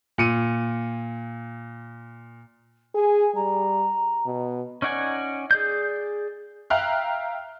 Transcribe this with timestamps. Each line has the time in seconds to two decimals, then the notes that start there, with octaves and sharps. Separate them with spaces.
0.18 A#2 C#7 D#7
2.95 G#4 G#5
3.35 G3 A#5
4.26 B2
4.82 C#4 D#4 D5 F#5 G#5
5.51 G#4 D5 G6
6.70 E5 F5 G5 A#5 F6 F#6